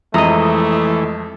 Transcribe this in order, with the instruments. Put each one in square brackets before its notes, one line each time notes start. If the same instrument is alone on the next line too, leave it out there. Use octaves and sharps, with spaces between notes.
[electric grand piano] F2 G#3 D#6 [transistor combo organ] E3 [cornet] A3 [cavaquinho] D#5 A#5